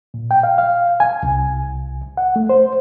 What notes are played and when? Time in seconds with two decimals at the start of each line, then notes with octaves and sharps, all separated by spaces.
0.14 A#2
0.31 G5
0.43 F5
0.58 F5
1.00 G#5
1.23 C2
2.17 F#5
2.36 A3
2.49 C5